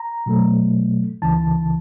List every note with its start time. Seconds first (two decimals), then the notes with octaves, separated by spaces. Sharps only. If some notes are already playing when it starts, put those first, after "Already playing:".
Already playing: A#5
0.26 B2 F#3 A3
1.22 C#2 C#3 E3 A5